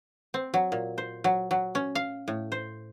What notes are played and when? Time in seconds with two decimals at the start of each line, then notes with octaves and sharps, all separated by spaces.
0.34 C4
0.54 F#3
0.72 A#2
0.98 C5
1.24 F#3
1.51 F#3
1.75 C#4
1.95 F5
2.28 A2
2.52 C5